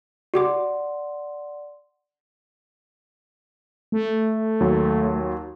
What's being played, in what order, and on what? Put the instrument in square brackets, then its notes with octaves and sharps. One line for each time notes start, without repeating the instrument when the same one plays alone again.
[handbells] F#4 G4 D6 [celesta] D5 F#5 C6
[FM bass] A3
[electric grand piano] D#2 F#3